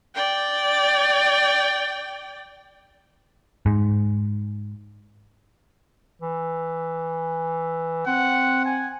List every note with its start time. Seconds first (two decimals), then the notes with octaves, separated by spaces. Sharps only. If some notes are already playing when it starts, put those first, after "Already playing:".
0.15 D5 G5
3.66 G#2
6.22 E3
8.07 C4 F#5
8.65 G#5